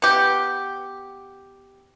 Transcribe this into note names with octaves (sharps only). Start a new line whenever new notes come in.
B3 G4